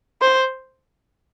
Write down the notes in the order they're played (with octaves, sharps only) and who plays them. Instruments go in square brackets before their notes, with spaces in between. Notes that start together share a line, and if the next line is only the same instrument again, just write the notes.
[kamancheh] C5